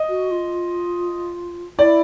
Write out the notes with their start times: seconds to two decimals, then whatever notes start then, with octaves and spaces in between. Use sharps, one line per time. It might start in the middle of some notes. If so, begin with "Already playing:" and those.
Already playing: D#5
0.09 F#4
0.31 F4
1.79 E4 D5